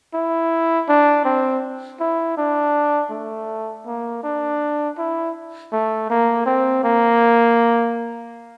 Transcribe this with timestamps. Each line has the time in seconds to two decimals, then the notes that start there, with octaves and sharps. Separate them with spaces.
0.14 E4
0.89 D4
1.25 C4
2.00 E4
2.38 D4
3.11 A3
3.86 A#3
4.23 D4
4.98 E4
5.73 A3
6.10 A#3
6.46 C4
6.84 A#3